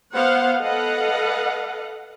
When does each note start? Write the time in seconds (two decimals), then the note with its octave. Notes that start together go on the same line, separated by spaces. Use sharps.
0.15 B3 C5 F5 F#5
0.62 A4 B4 D#5 F5 F#5